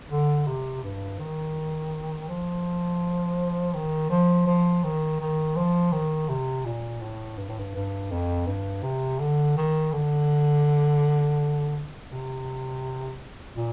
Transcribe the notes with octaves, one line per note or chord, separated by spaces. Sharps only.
D3
C3
G2
D#3
F3
D#3
F3
F3
D#3
D#3
F3
D#3
C3
A#2
A2
G2
A2
G2
G2
F2
G2
C3
D3
D#3
D3
C3
A#2